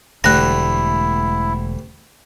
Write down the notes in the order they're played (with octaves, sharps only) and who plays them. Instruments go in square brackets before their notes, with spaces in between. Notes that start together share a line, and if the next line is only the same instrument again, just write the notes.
[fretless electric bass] E1 [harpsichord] D2 G3 A3 [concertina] E4 [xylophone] F#6 A#6